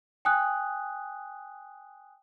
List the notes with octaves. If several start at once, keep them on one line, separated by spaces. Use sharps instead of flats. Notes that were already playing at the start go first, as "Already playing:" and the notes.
G5 G#5 D#6 F#6